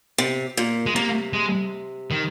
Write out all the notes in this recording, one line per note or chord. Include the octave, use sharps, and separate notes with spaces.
C3
A#2
G#3
C3 A#3
G#3
D#3